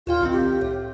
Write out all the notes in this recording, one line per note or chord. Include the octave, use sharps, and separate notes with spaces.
D#2 A#2 F4 G5
C2 D#3 C4
G4
A2